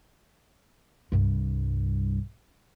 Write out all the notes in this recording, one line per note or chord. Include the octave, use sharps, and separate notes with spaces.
C2 G2